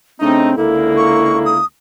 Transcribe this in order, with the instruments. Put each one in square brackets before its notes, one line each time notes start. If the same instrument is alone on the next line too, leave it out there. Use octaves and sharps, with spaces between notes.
[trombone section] C#3 A3 D#4 [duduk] C4 [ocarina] D4
[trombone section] C#2 D3 A#3 [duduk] E4 [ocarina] A4
[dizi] C#6
D#6